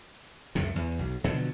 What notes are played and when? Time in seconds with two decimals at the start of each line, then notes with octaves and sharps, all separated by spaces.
0.55 C#2 F#2 A2 C3
0.76 E2
0.99 B1
1.24 B2 D3 F3 F#3